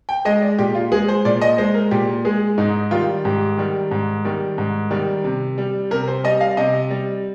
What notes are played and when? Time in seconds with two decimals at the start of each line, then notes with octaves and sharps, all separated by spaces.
0.09 G5
0.25 G#3 D#5
0.42 D5
0.58 A#2 G4
0.75 F4
0.92 G#3 G#4
1.08 C5
1.25 A#2 D5
1.42 D#5
1.58 G#3 C5
1.74 A#4
1.91 A#2 G4
2.25 G#3 G#4
2.58 G#2 D#4
2.91 D#3 G3 F4
3.25 G#2 G4
3.58 D#3 G3
3.91 G#2
4.25 D#3 G3
4.58 G#2
4.91 D#3 G3
5.24 C3
5.58 G3
5.91 C3 A#4
6.08 C5
6.24 G3 D#5
6.41 F5
6.57 C3 D#5
6.90 G3